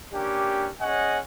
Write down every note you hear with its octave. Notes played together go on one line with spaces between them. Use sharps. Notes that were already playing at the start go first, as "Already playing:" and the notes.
A#3 C#4 D4 G4
C#4 G#4 C#5 D#5 F#5 G#5